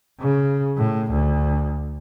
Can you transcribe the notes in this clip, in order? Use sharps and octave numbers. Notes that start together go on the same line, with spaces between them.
C#3
A2
D2